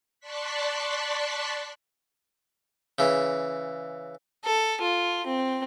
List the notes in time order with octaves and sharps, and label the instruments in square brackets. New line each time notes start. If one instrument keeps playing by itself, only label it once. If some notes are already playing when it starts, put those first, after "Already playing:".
[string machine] D5 A5 C6 C#6 F#6 B6
[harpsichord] C#3 E3
[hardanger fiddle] A4
F4
C4